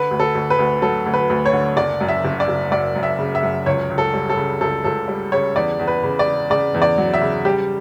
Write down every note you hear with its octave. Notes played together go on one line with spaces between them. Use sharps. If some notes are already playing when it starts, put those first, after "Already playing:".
Already playing: D3 B4
D2
A4
D2
B4
D2
F#3 A4
D2
B4
D2
C#5
D3
F#1 D5
F#2
E5
F#1
D5
F#1
F#2 D5
F#2
E5
C#3
E5
F#2
C#2 C#5
C#2
A4
G3
A4
C#3
C#2 A4
C#2 A4
G3
C#3 C#5
E2 D5
E2
B4
C#3
D5
C#3
C#3 D5
E2
D5
F#3
E5
C#3
G3 G4